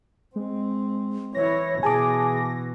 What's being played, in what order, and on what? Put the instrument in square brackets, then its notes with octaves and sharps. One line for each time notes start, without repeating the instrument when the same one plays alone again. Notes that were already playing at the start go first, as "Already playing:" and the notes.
[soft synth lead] G#3 [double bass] C4
[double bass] E3 E4 [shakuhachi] C#5 [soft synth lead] A#6
[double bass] B2 E3 [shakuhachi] G#4 [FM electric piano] G#5 A5 D6